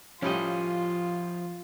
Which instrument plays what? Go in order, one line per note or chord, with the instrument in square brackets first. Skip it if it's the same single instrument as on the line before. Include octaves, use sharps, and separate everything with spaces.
[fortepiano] A2 G3 C#4 [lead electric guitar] F3 D#5 [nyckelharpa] F4